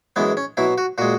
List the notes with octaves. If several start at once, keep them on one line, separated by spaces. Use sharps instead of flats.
F#2 E3 G#3 B3
C#4
B2 F#3 E4
F#4
A#2 G#3 F#4